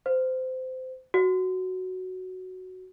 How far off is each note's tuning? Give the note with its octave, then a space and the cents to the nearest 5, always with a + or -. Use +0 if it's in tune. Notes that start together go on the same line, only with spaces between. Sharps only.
C5 -20
F#4 +5